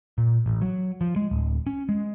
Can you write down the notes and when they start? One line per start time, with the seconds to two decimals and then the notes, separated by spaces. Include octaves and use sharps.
0.18 A#2
0.46 A1
0.62 F#3
1.01 F3
1.16 G#3
1.31 D1
1.67 C#4
1.89 G#3